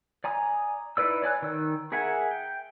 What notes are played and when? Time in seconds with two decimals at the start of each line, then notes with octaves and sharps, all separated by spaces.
0.24 D5 G#5 A#5 D#6
0.97 D#4 E4 B4 D5 E6
1.22 C#5 D5 G#5 F#6
1.42 D#3 E6
1.92 G#4 A#4 E5 F#5 G#5
2.31 G5